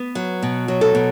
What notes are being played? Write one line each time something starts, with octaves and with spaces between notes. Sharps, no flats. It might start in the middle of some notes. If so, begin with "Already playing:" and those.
Already playing: B3
F#3
B2
F#3
A4
B2